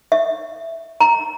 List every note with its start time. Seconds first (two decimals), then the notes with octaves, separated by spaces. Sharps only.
0.12 E5
1.01 A#5